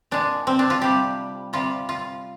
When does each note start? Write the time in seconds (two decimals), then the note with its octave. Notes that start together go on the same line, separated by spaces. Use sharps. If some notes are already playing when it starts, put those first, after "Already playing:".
0.11 A#2 G#3 D4
0.47 C4
0.59 D4
0.70 F4
0.82 C3 G3 G4
1.53 C3 G3 F4
1.89 F4